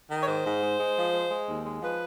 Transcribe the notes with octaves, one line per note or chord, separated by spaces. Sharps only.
D#3
C#5
G#2 C5
G#2
G#3
G#3
F3
G#3
G#3
D#2
G#3
F3 B4